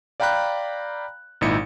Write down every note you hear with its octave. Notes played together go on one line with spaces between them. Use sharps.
D5 F5 G5 A#5 B5 F#6
G#1 A#2 D#4 E4 C#7